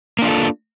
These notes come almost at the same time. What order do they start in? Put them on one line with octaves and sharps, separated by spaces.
A#3 D4 F4 A4